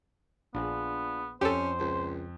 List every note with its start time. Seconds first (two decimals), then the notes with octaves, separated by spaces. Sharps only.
0.55 A#1 B3 D4 F4 G#4
1.41 F2 C#4 G4 A4 C5
1.80 C#2